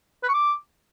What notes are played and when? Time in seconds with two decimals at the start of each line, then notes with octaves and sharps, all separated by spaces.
0.23 B4
0.28 C#6
0.34 D6